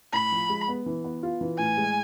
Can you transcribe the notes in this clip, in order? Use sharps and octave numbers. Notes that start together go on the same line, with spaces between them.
A2 B5
F3
G#3
B3
E3
B3
F4
E3
A2 G#5
G#3